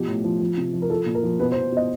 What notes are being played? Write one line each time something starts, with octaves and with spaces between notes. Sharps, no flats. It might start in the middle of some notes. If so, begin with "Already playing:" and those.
Already playing: B2 F3 G4
A2
F3
F3
C3
F3
A#4
F3 A4
A#2
A#4
F3
B2 B4
C5
B2
B2 D#5